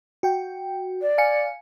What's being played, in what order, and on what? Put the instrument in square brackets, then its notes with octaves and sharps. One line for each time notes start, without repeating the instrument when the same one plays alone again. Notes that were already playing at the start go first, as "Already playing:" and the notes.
[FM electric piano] F#4 G5
[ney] D5
[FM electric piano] F5 G#5 C#7